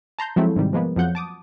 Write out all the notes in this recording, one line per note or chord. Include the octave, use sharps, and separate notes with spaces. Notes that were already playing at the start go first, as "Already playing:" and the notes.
A5 A#5 C6 G6
F3 F#3 G#3 A3 C4 E4
G#2 C3 D#3 G3
F3 G#3 A#3 B3
F2 F3 F#3 F#5 G6
A5 D6 D#6